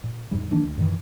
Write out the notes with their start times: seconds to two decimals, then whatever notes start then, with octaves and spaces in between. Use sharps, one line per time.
0.04 A#2
0.31 E2 G#2 C3 G3
0.51 D#3 E3 A#3 D4
0.65 D2
0.77 F#2 A#2 D#3 E3